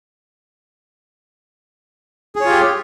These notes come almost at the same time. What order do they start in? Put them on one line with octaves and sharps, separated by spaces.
G#4 C#5 F4 G4